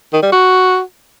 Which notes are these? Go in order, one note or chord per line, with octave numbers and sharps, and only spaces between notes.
D#3
G3
F#4